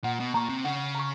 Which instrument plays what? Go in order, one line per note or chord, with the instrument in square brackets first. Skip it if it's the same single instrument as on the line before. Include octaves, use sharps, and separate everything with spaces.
[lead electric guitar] A#2 [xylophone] F#5
[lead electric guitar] B2
[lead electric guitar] A#2 [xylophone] A#5 C#6
[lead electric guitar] C3
[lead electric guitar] C#3 [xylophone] F#5
[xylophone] A#5 C#6